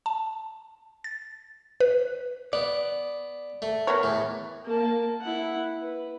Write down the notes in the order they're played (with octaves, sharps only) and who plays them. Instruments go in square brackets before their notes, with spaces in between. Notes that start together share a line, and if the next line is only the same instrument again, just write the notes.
[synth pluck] A5
A6
B4
[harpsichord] B3 [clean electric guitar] D5
[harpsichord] A3
[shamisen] B3 A#4 C#5
[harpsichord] E2 A2
[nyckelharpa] A#3 A5
E4 F#5
B4